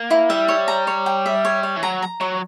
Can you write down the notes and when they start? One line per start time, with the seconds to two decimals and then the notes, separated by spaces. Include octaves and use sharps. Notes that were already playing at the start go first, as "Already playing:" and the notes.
Already playing: A#3
0.11 E4
0.30 G3 E5
0.48 C#5
0.68 A#5
0.87 C#5
1.06 G5
1.26 E5
1.45 C#5
1.63 C#5
1.76 E3
1.83 F#3 A#5
2.02 A#5
2.21 F#3 C#5